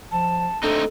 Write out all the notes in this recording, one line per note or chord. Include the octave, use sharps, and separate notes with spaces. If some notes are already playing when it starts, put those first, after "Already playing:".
F3 A5
A3 C4 D4 D#4 A4